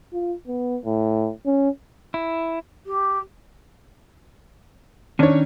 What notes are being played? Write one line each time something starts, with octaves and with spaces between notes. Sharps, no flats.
F4
B3
A2
C#4
E4
G4
D#3 C#4 D4 C#5